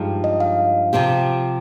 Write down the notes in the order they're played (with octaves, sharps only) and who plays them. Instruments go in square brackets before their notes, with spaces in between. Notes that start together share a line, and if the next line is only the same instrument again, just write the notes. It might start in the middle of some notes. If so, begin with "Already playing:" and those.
Already playing: [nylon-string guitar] G2 F3 G#3 D#4 G4
[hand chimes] D#5
F5
[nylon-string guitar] C3 F3 C4 G4